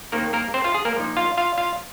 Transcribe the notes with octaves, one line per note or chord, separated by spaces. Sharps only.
D#2 D#3 A#3 C4 D#4 A#4
A#3 A#4
C4 C5
F4 F5
G#4
A#3 A#4
A#2 F3 A#3 D#4
F4 F5
F4 F5
F4 F5